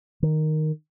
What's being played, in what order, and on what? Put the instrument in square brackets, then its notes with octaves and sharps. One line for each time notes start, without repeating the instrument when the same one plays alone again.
[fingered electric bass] D#3